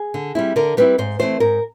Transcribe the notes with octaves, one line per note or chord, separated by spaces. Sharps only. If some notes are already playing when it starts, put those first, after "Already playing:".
Already playing: G#4
D3
G3 C4 E4
D3 A#4
G3 C4 E4 B4
G#2 C5
E3 A3 C4 E4 C5
G#2 A#4